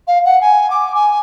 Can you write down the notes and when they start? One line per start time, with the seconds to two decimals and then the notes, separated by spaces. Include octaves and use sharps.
0.07 F5
0.25 F#5
0.41 G#5
0.70 D6
0.95 G#5